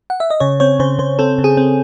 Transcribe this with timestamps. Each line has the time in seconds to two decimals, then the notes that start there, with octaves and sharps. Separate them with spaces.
0.10 F#5
0.20 E5
0.30 D#5
0.40 C#3 C#5
0.60 C4 C#5
0.79 C#3 C5
0.99 C#3 C5
1.19 C4 A4
1.38 C#3
1.44 G#4
1.57 C4